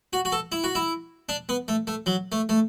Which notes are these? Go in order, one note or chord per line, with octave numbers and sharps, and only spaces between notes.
F#4
F#4
A4
E4
F#4
E4
D4
B3
A3
A3
F#3
A3
A3